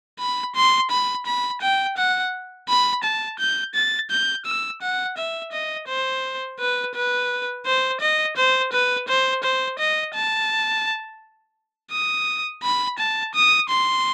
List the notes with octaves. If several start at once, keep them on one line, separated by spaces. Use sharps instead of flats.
B5
C6
B5
B5
G5
F#5
B5
A5
G6
A6
G6
E6
F#5
E5
D#5
C5
B4
B4
C5
D#5
C5
B4
C5
C5
D#5
A5
D#6
B5
A5
D#6
C6